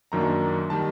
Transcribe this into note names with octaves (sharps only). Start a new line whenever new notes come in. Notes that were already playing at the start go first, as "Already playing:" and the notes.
F#2 D#3 F#3 A#3 D4 A#5
D#3 G3 A5